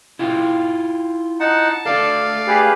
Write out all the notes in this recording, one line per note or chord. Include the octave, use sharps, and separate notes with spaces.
E4 F4 G5
D#4 F#5 A5
A3 D4 A4 D5 F5
G4 G#4 B4